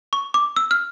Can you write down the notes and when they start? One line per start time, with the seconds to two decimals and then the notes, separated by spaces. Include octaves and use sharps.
0.13 C#6
0.34 D6
0.56 E6
0.71 F6